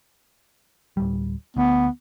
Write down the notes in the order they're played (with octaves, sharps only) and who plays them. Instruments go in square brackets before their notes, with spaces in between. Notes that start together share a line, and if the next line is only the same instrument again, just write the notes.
[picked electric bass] D1 G3
[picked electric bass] D2 [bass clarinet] B3